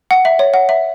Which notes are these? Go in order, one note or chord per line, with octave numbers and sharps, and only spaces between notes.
F#5
E5
C#5
F#5
E5